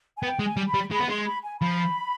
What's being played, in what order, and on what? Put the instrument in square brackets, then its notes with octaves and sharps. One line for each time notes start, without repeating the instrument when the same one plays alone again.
[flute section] G#5
[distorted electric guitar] B3 [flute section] G5
[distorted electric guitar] G#3
[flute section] G#5
[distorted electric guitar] G3
[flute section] B5
[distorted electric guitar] G3
[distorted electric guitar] G#3 [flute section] B5
[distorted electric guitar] B3
[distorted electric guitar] G#3 [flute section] C6
[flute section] B5
G#5
[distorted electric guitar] F3 [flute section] B5